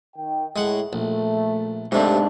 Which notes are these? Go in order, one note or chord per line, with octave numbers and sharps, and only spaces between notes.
D#3 G5
A2 G#3 F#5
A#1 A3
G#2 C3 A3 D4